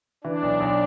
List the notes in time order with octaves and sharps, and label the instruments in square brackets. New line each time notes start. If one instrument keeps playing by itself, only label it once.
[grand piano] E3 [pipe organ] D4
[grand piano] B1
B1